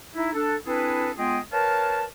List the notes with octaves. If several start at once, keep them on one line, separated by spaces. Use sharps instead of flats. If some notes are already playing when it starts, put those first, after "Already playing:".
D#4 E4
D4 A4
C4 D4 E4 G#4 A4 B4
G#3 B3 F4 G#4 D#5 G5
A#4 B4 C#5 F5 A5